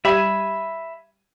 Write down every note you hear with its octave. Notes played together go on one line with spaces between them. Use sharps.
G3 E5 B5 G#6 D#7